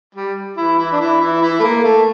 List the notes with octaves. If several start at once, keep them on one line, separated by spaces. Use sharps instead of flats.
G3
E3 E4
E3 E4
D4
E3 E4
E3 E4
E3 E4
A3
A#3
A3